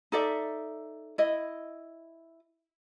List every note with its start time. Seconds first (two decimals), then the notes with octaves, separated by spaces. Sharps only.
0.12 D#4 A4 D5 E5
1.18 E4 D#5